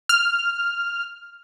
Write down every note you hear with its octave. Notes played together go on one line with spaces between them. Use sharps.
F6